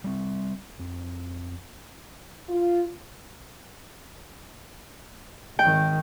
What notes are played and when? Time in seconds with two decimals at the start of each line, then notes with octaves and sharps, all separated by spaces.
0.04 G3 C4
0.79 F2
2.49 F4
5.59 G#1 D#3 G5